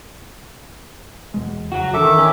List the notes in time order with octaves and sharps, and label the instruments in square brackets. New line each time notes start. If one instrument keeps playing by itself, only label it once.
[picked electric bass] E2 B2 G#3
[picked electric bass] F2 C#3 [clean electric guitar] F#3 F#4
[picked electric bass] G#1 E3 D4 [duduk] D#3 [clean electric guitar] A4 [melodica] E5 D6
[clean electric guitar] C#4